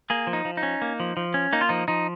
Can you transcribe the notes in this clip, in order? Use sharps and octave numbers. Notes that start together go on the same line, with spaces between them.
A#3 G#4
F3
D#4
F3
D#4
C#4
A#3
F3
F3
C#4
A#3 D#4
F4
F3 D#4
F3 D#4